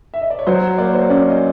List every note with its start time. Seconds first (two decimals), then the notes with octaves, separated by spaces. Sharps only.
0.14 E5
0.21 D#5
0.30 D5
0.39 C#5
0.47 F#3 C5
0.78 A#3 D5
0.85 C#5
0.93 C5
1.00 C#5
1.09 C#4 D5
1.30 D#5